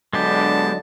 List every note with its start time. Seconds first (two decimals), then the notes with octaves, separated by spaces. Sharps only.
0.13 D3 F#3 G#3 B3 D4 G4 D#5 A5